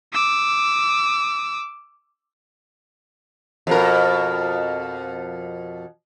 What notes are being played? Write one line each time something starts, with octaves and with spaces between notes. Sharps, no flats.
D6 E6
F2 B2 A#4